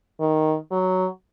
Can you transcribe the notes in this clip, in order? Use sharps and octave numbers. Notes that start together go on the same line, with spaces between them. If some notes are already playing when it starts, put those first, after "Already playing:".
D#3
F#3